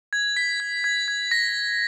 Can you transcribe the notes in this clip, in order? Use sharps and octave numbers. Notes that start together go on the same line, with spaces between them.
G#6
B6
G#6
G#6
G#6
A#6